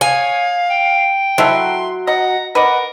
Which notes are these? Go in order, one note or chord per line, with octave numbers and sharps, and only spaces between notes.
G#4 C#5 F5 G#5
G5
F#3 E4 A4 E5 C6
D#5 F#5 A#5
A#4 B4 D5 D#5 F#5